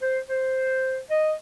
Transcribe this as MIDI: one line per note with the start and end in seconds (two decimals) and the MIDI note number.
0.01 0.18 72
0.29 0.98 72
1.10 1.32 75